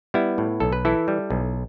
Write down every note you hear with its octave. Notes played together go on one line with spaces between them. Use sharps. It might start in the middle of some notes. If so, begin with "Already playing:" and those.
G3 B3 E4
A2
B1 A4
B4
E3 E4 A4
G3
B1